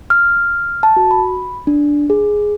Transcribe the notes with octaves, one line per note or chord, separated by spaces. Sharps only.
F6
A5
F#4
B5
D4
G#4